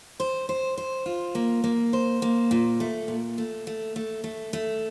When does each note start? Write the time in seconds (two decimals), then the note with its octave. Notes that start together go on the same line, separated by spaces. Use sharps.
0.20 C5
0.49 C5
0.77 C5
1.06 F4
1.35 A#3
1.64 A#3
1.93 C5
2.22 A#3
2.51 A#2
2.80 A3
3.08 A#2
3.38 A3
3.67 A3
3.96 A3
4.24 A3
4.53 A3